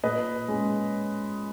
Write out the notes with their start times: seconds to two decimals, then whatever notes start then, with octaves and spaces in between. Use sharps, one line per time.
0.03 A#2 B4 D#5
0.48 G#3 C#4